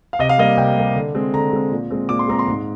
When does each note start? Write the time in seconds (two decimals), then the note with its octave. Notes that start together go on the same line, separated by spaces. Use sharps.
0.13 F5
0.19 C3 D#5
0.29 F5
0.38 G3 A#3 D#5
0.57 C3 G5
0.76 G3 A#3
0.96 D3
1.15 G#3 C4
1.34 D3 A#5
1.53 G#3 C4
1.72 A#2
1.91 G#3 C4
2.09 A#2 D6
2.19 C6
2.28 G#3 C4 A#5
2.39 C6
2.48 G#2